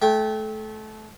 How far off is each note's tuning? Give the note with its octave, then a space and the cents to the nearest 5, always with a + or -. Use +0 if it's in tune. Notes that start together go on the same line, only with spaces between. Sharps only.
A3 -25 G5 +0